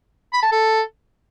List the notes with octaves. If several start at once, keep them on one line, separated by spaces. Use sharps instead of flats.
B5
A5
A4